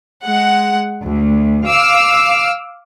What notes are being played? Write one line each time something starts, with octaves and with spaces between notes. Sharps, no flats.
G#3 F#5
D2
F5 D6 E6 F6